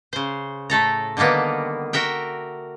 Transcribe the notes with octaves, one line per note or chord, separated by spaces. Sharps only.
C#3 C5
A2 A3 A4 A#5
D3 D#3 G3 A#3 B3
F#4 A#4 E5 G5